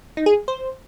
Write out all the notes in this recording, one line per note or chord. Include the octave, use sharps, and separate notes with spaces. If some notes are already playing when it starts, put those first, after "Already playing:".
D#4
G#4
C5